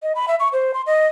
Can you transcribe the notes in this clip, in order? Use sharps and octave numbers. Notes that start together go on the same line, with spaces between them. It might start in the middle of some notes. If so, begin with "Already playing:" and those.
D#5
B5
E5
C#6
C5
C6
D#5